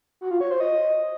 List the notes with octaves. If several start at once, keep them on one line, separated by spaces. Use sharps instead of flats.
F#4
F4
C#5
C5
D#5